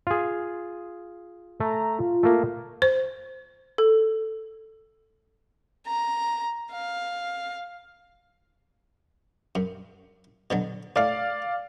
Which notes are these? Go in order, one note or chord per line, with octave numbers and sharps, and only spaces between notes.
F4 G#4
A3 A#5
F4
A3 A#3
C5
A4
A#5
F5
F#2
B2 D3 F#3
A2 A3 D5 F5